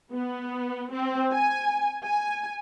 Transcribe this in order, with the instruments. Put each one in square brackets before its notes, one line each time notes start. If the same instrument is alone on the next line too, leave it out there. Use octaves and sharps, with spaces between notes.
[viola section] B3
C4
G#5
G#5